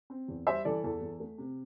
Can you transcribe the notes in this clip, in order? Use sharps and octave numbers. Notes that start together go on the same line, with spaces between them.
C4
E2
G3 C5 E5
E3 A4 D5
E2 A4
E2
A3
C3